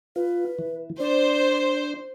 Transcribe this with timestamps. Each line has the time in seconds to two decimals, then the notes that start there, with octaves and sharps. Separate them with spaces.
0.16 F4 B4
0.59 E3
1.00 D4 C5 D5